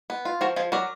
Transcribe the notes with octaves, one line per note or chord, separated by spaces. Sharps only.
B3
F4
F3 F#4 A#4
F3 F4 G#4
F#3 A#4 D5